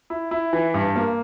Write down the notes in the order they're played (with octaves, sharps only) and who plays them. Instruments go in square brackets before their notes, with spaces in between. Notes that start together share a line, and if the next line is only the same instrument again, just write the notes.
[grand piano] E4
E4
E3
G2
A#3